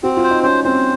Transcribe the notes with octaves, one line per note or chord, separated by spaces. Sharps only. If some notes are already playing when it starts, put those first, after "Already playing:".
C4 F#4
F4
C5
D#4
C#4 C5
C4 C5